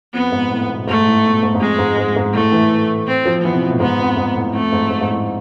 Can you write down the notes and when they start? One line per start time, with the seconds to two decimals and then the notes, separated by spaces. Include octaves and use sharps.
0.14 F2 B3
0.32 G#2
0.51 A2
0.70 B2
0.87 G#2 A3
1.06 A2
1.24 B2
1.42 G#2
1.55 G#2
1.60 F2 G#3
1.79 G#2
1.98 G#2
2.16 G#2
2.34 A2 A3
2.52 E3
3.07 C4
3.26 F3
3.44 E3 B3
3.53 C3
3.62 B2
3.72 A2
3.80 G#2 B3
3.99 F2
4.17 G#2
4.36 A2
4.53 F2 A3
4.72 G#2
4.90 G#2
5.01 G#2
5.09 A2